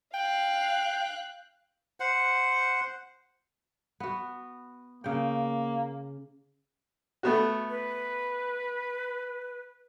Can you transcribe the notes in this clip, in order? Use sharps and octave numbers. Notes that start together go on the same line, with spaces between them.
F5 G5 F#6
C5 F#5
B3 F#4
C#3 A#3 G5
A3 B3 F#4
B4